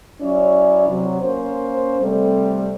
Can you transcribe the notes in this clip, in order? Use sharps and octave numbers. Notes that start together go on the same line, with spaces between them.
F#3 C#4 E4 D5
C3 F#3
A#3 C#4 C5
C3 G3 A3 C4 A4